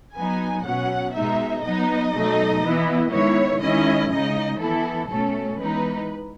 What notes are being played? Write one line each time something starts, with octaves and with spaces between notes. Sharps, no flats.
F#3 B3 D#4 G#5
B2 F#3 C#4 F#5
B2 G#3 D#4 E5
F#3 B3 D#4 D#5
B2 F#3 A3 D#4
E3 B3 E4
D#3 G#3 B3 E4 C#5
D#3 G#3 C#4 E4 D#5
C#3 G#3 D#4 D#5
E3 B3 E4 A4
B2 A3 C#4 A4
E3 G#3 B3 D#4 B4